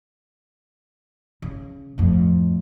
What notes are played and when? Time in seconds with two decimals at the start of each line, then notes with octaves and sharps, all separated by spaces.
1.42 C#3
1.98 F2 A2